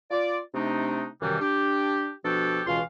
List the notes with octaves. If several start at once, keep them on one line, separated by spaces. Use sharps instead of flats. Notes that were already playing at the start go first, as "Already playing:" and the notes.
F4 D5
C3 A3 D4 D#4
F#2 C3 D#3 E3 G3
D4 G4
B2 F3 D4 F#4 G4 A4
C#2 B2 E3 F4 F5 C6